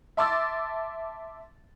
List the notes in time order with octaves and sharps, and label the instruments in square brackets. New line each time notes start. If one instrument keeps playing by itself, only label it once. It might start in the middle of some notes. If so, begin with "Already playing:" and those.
[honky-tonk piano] E5 A5 C6 D6 E6 A6